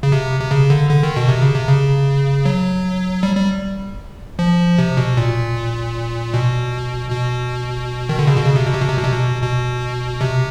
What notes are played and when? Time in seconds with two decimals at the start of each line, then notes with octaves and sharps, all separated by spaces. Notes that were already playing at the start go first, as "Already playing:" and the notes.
0.03 C#3
0.12 C3
0.41 C3
0.51 C#3
0.70 D3
0.90 D3
1.03 D#3
1.16 B2
1.29 C3
1.42 C#3
1.55 C3
1.68 C#3
2.45 F#3
3.23 G3
3.36 G3
4.39 F3
4.79 C3
4.97 B2
5.17 A#2
6.34 B2
7.10 B2
8.09 D#3
8.19 D3
8.27 C#3
8.37 B2
8.46 C#3
8.56 C3
8.66 B2
8.74 C3
8.81 B2
8.89 C3
8.97 B2
9.04 C3
9.13 B2
9.43 B2
10.21 C3